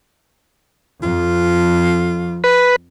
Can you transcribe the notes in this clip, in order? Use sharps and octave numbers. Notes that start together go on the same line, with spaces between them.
F2 F4
B4